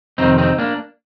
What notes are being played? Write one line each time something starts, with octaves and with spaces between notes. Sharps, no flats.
F2 C3 D#3 C4 D#4
C4 D#4
A#3 D4